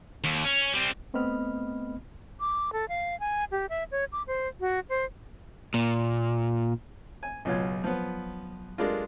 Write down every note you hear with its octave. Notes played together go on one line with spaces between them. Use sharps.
D#2
C#4
G3 C4
A3 B3 C4 D#5 B5 F6
D6
A4
F5
G#5
G4
E5
C#5
D6
C5
F#4
C5
A#2
G#5
C#2 B2 F#3 F4 C#5 G#6
F3 B3
G#3 D4 F4 G4 A4 A#4